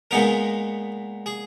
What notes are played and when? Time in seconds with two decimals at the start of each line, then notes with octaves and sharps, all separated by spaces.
0.11 A#2 G#3 B3 D#4 A#4
1.26 G#4